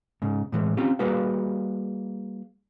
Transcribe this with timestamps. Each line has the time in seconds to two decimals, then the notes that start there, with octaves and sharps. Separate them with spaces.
0.22 G#2 C#3
0.52 A2 E3 G#3
0.77 C4 C#4 F4 G4
0.99 G3 A#3 F#4 G#4 B4 F5